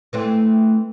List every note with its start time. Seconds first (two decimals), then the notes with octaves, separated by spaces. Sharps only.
0.13 E3 A3 C4